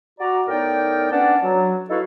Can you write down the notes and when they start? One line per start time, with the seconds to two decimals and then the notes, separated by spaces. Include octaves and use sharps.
0.20 F#4 D5 A#5
0.48 A2 B3 D#4 A#4 D5 G5
1.11 B3 C#4 D4 D5 F#5 A5
1.42 F#3
1.90 D#4 E4 F#4 A4 B4 F5